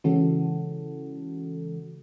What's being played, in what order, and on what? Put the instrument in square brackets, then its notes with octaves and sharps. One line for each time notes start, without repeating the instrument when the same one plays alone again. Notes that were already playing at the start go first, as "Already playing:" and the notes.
[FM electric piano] C#3 E3 G#3 C#4 F#4 A4